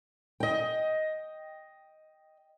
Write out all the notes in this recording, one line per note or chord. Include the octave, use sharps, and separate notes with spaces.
D#5 G5